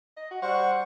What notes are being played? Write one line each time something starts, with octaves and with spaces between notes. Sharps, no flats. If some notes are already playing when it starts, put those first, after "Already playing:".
D#5
F#4
G3 C5 F#5 C#6